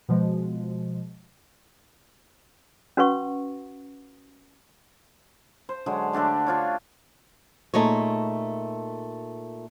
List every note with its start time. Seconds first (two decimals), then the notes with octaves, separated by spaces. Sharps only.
0.09 B2 F3 G#3
2.97 C#4 F#4 B4 F#5 C#6
5.69 C5
5.86 D3 F#3 G#3
6.13 D3 A3 D4 G4
6.47 D4 F4 C#5
7.74 A#2 A3 D#4 G#4 C#5